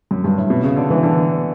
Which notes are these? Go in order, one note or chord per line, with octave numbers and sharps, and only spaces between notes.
F#2
G2
A2
B2
C#3
D3
E3
D3